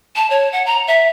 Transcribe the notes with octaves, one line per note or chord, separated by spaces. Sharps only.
A5
C#5
F#5
A#5
E5